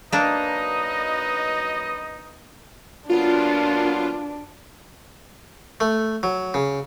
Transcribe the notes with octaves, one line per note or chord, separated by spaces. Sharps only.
F#2 F#3 A#3 D4 D#4 B4 D#5
F#3 A#3 B3 D4 F4
A3
F#3
C#3